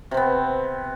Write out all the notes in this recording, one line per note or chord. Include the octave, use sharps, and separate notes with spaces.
C3 B3 C4